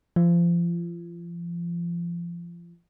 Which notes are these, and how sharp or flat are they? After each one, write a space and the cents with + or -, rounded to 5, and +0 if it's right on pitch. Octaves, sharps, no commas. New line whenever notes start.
F3 -30